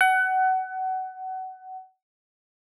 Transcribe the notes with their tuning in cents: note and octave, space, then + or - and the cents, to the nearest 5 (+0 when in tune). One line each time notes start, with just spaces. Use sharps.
F#5 +25